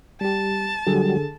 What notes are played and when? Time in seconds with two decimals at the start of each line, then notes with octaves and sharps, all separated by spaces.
0.21 G3 G4 A5
0.87 D3 F#3 G3 G#4 A4